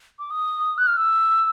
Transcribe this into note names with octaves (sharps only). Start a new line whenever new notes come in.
D6
D#6
F#6
F6
E6